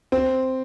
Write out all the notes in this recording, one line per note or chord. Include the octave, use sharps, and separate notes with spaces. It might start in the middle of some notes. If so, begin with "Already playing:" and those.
C4